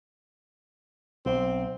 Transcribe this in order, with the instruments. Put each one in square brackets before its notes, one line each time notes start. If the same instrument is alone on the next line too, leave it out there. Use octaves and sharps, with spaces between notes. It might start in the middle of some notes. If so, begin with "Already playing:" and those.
[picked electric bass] B1 [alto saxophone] C4